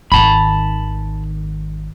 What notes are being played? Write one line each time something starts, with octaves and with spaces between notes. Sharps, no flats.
G#1 D#3 A5 B5